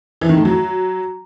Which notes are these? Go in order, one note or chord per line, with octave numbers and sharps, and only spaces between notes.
E3
D#3
A2
F#3